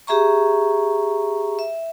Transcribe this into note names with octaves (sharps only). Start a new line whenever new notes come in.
G4 G#4 E5 A#5 C#6
E5